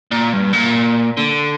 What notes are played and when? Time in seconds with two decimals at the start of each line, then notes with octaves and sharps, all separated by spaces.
0.11 A#2
0.33 G2
0.53 A#2
1.17 D3